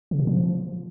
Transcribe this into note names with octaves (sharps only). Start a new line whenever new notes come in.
C#3
B2
F3